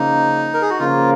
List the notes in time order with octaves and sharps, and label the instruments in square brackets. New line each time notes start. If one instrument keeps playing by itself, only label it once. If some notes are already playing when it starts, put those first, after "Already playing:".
Already playing: [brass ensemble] C#3 F3 A#3 [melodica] D#4
[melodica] A#4
G#4
F#4
[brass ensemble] C#3 F3 A#3 [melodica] F4